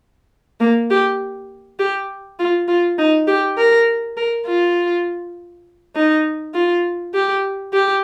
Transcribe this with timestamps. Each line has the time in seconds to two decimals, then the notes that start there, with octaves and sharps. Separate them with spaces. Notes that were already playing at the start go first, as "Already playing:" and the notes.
0.60 A#3
0.90 G4
1.79 G4
2.39 F4
2.68 F4
2.98 D#4
3.27 G4
3.57 A#4
4.17 A#4
4.46 F4
5.95 D#4
6.54 F4
7.14 G4
7.73 G4